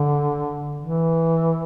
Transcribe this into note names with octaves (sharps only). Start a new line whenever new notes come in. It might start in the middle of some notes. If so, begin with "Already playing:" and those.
Already playing: D3
E3